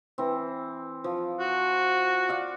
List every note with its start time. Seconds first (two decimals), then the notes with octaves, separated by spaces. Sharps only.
0.18 E3 C4
1.04 F3
1.40 F#4
2.29 D5 F5 F#5